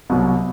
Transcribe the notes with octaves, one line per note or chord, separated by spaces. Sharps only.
C2 B2 F#3